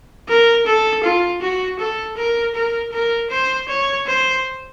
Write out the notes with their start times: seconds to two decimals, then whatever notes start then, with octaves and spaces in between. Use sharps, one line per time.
0.29 A#4
0.67 A4
1.04 F4
1.42 F#4
1.80 A4
2.17 A#4
2.55 A#4
2.92 A#4
3.30 C5
3.68 C#5
4.07 C5